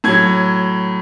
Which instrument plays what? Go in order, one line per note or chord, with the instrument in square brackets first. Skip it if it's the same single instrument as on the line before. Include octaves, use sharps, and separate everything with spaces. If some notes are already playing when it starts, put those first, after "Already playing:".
[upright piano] A2 F#3 G#6